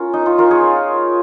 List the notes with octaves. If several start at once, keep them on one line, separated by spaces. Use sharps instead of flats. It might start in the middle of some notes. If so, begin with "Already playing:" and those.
Already playing: C#4 F4 A#4
D#4
C#4 F4
F4 A#4
G#4 C#5